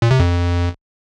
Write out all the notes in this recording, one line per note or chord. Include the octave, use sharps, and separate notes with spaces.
A#2
C3
F2